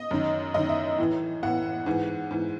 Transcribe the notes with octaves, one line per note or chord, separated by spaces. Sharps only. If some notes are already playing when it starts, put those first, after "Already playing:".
Already playing: D#5
F#2 D#3
F#2 D#3 D#5
E5
A2 E3
A2 E3 F#5
G#2 E3
G#2 E3